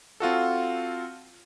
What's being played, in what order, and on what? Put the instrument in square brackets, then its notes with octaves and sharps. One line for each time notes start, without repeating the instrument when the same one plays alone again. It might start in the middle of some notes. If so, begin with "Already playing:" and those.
[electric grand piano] C4 F4 F#4 A4